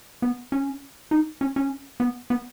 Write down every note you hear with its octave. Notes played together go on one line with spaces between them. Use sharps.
B3
C#4
D#4
C#4
C#4
B3
B3